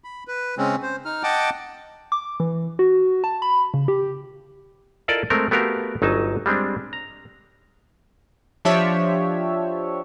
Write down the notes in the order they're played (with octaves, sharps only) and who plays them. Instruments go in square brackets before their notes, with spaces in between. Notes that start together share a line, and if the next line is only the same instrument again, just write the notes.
[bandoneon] B5
B4
C#3 G#3 C4 C#4
C5
D#4 F6
D#5 F#5 G5 A5 D6
[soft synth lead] D6
E3
F#4
A5
B5
C#3
G4
[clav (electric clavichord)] E4 F4 A4 A#4 D5 D#5
G#3 A3 C4 A#4
A3 B3 F#4 G4 A#4 F5
G1 F#3 D#4 G#5 A5
G3 G#3 C4 D4
A#5
[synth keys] F3 D4 G4 C#5 E5